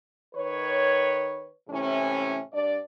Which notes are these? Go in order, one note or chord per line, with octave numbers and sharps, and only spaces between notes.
D#3 B4 C#5
A2 C3 E3 C#4
G2 D4 D5